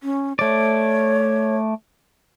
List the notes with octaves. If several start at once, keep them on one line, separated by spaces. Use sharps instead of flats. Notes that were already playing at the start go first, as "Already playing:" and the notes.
C#4
A3 C#5 D5